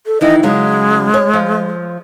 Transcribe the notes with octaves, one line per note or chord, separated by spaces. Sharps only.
A4
D#3 E3 E4 D#5
C#3 F#3 G#3
C#5
F3